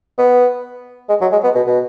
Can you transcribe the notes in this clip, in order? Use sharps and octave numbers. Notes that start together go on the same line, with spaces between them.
B3
G#3
F#3
G#3
B3
B2
B2